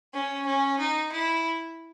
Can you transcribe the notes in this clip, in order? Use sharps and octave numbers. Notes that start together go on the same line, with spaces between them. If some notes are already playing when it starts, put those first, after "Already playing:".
C#4
C#4
D#4
E4